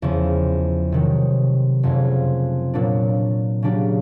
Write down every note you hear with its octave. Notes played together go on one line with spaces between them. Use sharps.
E2 C#3 F3
C3 D#3 F#3
F1 F2 C#3
A#2 F#3 A#3 D4
C#3 F#3 A#3 D4 G4